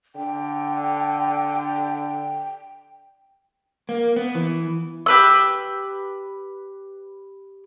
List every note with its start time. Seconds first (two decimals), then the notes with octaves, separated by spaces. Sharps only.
0.15 D3 G5
3.89 A#3
4.16 B3
4.35 E3
5.06 G4 B4 E6